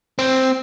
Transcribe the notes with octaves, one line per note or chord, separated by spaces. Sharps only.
C4